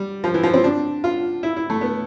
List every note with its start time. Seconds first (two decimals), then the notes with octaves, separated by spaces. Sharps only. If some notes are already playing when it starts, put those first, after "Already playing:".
Already playing: G3
0.24 F3
0.34 E3
0.43 F3
0.54 C4
0.64 D4
1.04 F4
1.43 E4
1.56 E4
1.70 A3
1.81 B3